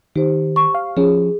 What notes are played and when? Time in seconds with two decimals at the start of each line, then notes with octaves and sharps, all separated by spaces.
0.16 D#3 G4 C5
0.56 C#6
0.74 F5
0.97 F3 C#4 G#4